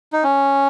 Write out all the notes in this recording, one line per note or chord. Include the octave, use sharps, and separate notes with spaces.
D#4
C#4